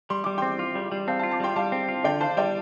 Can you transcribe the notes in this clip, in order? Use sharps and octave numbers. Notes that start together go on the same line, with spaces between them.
G3 C6
G3 D6
C4 G5 C6
F4
G3
G3
C4 F5 A5
F4 F5 A5
A5 D6
G3 G5 C6
G3 F5 A5
C4
F4
D3 D5 G5
C5 F5 A5
G3 D5 G5